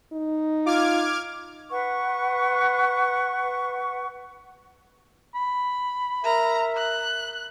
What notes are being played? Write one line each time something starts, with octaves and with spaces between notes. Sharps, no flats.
D#4
F4 D6 F6 G#6
B4 F#5 C#6
B5
A#4 E5 A#5
F#6